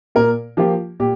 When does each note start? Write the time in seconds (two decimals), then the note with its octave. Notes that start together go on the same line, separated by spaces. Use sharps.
0.15 A#2 A#4
0.57 F3 A#3 F4 G4
1.00 A#2 G4